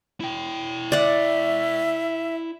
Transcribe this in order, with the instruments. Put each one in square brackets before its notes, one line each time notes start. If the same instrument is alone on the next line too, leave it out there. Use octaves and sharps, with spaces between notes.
[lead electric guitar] E4 G5
[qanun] D5 F#5 [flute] E5